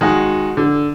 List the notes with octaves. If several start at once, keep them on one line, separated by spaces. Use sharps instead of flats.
D#3 G#3 F#4
D3